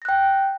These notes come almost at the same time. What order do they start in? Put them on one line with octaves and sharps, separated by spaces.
A#6 F#6 G5